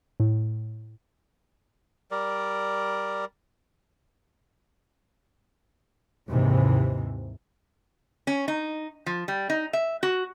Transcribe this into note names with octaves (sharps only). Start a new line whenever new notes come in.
A2
G3 A#4 D5
D#2 G#2 C3 E3
C#4
D#4
F3
G3
D#4
E5
F#4